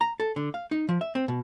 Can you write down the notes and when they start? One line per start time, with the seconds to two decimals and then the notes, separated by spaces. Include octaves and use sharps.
0.01 A#5
0.20 A4
0.36 D3
0.54 F5
0.71 D#4
0.89 F3
1.01 E5
1.15 C4
1.28 B2